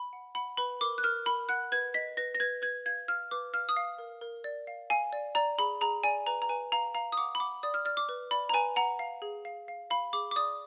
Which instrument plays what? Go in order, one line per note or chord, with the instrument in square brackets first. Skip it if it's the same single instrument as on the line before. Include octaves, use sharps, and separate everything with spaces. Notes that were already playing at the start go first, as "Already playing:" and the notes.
Already playing: [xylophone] B5
F#5
F#5 B5
B4 B5
A#4 D6
F#6
A#4 F6
A#4 B5
F#5 F#6
B4 G#6
D#5 B6
B4 A#6
A#6
B4 G#6
B4 G#6
F5 G#6
F5 F6
B4 D6
F5 F6
D#6
F5
A#4
A#4
D5
F5
F5 G#5
D5
D5 A#5
G#4 B5
G#4 A#5
D5 G#5
B4 A#5
A#5
B4 G#5
F5 A#5
F5 A#5
D#6
F#5 D6
B5
F#5 D6
D5 D#6
F6
D5 F6
D6
B4
D5 B5
A#5
B4 G#5
F#5 A#5
F5
G#4
F5
F5
F5 B5
G#4 D6
D6
D5 D#6